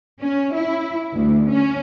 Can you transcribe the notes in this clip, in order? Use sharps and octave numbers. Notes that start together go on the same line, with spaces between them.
C#4
E4
D2
C#4